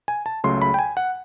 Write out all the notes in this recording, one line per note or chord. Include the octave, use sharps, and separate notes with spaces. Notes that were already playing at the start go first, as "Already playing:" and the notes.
G#5
A5
C#2 C#3 F#3 A3 C6
B5
G5
G#5
F#5